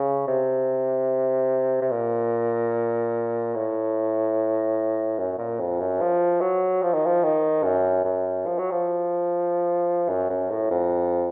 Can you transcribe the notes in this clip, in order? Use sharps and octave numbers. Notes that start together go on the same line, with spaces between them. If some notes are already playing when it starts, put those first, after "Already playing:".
Already playing: C#3
C3
C3
A#2
A2
F#2
A#2
F2
F#2
F3
F#3
F3
D#3
F3
D#3
F#2
F#2
F3
F#3
F3
F#2
F#2
A2
F2